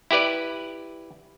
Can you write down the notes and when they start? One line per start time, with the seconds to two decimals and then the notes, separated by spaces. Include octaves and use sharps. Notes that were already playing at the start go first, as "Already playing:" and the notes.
0.11 E4 G4 B4 D5